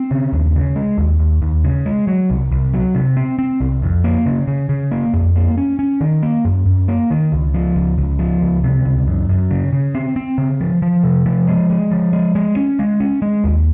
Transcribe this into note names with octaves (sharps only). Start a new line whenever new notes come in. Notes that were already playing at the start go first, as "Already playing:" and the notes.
Already playing: C4
C#3
D#2
C#3
G#3
D#2
D#2
D#2
C#3
G#3
F#3
C2
C2
F#3
C3
C4
C4
C2
F2
A#3
C#3
C#3
C#3
A#3
F2
A#3
C#4
C#4
D#3
A#3
F#2
F#2
A#3
D#3
C#2
F3
C#2
C#2
F3
C#2
C3
C#2
F#2
F#2
C#3
C#3
C4
C4
C#3
F3
F3
C3
F3
G#3
G#3
F3
G#3
G#3
C#4
G#3
C#4
G#3
D#2